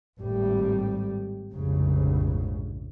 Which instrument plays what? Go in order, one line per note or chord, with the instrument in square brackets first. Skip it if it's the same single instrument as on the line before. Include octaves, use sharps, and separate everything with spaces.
[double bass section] G#1 A2 G3
F1 A#1 G#2 C#3